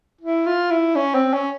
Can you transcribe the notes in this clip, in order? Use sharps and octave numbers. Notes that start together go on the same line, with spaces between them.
E4
F4
E4
C#4
C4
C#4